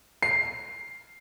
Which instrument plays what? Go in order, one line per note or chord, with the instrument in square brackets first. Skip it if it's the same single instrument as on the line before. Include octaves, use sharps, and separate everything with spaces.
[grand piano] C7